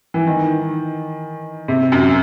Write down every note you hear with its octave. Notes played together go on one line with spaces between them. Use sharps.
E3
D#3
C3
F#2